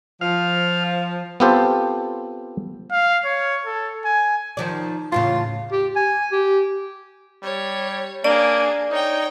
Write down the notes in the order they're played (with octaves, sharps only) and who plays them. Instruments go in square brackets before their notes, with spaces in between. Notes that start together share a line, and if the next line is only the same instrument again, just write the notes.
[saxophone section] F3 [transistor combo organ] F5
[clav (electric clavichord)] B3 C4 F4 G4 A4 C5
[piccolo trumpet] F5
C#5
A4
G#5
[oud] D#3 F3 D5
[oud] E2 A2 C#3 [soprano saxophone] F4
[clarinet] G4
G#5
G4
[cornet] G3 [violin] C#5
[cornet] A#3 [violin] D4 G#4 [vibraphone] D5
[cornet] D#4 [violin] C#5 G5